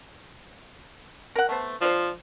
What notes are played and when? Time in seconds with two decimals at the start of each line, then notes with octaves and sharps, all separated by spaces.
1.36 A#4 F#5
1.49 A3 B3 C5
1.81 F3 D4 C5